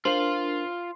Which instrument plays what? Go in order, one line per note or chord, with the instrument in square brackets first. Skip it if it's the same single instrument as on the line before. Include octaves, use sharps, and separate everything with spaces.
[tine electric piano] D4 A#4 [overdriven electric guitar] F4 F5 [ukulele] C5 [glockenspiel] C6 C7